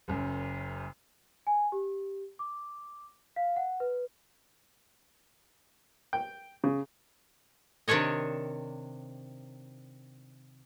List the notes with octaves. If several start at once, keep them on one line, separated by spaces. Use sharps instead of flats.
F#1 F#2
G#5
G4
D6
F5
F#5
B4
G5
C#3
C3 D#3 D4 C#5 D#5